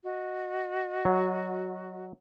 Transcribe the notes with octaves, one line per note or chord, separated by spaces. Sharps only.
F#4 D#5
F#3